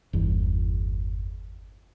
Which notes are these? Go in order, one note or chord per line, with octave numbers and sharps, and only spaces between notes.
G1 E2